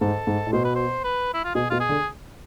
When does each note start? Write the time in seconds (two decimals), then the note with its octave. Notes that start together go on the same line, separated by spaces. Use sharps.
0.01 G#2 A4
0.27 G#2
0.47 A2
0.53 B2 C5
0.65 B4
0.75 C5
1.04 B4
1.34 E4
1.44 F4
1.55 B2 G#4
1.70 B2 F4
1.80 G#4
1.89 D3